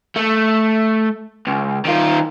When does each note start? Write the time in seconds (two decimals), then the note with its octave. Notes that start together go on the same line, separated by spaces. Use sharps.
0.16 A3
1.47 C#2
1.85 D#3 F4